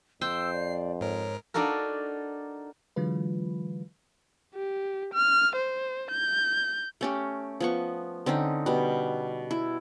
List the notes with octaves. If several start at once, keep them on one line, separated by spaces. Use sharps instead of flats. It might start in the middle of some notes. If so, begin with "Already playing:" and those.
F2 C5 G5 E6 C7
D5
G#2 A#4 C#5
D4 D#4 F#4 A4 A#4
D3 E3 F#3 G#3 F4 B4
G4
F6
C5
G6
A3 C#4 G4
F3 B3 C#6
D3 C4 C#4 D#4
B2 G3
E4